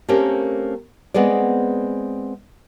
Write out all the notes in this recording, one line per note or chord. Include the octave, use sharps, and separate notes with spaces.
A3 A#3 C4 C#4 G4 A#4
G#3 B3 C4 G#4 D5